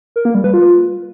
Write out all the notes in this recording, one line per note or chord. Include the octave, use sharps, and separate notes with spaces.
A#4
A#3
G3
B4
F4